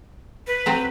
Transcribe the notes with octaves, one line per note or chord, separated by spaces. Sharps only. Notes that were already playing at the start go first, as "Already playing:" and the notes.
B4
F#3 C4 C5